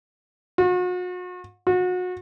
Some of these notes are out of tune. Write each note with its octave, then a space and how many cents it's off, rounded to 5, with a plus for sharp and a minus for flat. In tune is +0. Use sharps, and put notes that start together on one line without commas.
F#4 -40
F#4 -30